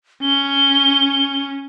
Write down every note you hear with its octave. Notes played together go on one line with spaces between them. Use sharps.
C#4 G7